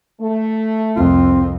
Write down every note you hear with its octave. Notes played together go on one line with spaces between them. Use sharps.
A3
C2 F2 C4 F4